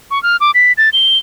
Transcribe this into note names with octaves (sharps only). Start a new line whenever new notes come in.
C#6
F6
D6
B6
A6
G7